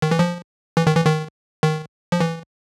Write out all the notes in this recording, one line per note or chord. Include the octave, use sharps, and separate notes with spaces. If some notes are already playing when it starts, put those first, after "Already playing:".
D#3
E3
F3
E3
D#3
E3
D#3
D#3
F3
E3